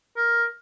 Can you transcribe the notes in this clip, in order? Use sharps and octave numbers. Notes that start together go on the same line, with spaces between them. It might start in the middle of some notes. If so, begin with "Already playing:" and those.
A#4